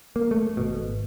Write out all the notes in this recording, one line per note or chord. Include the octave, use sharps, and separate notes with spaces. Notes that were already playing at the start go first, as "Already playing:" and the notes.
A#3
A3
G#1 B2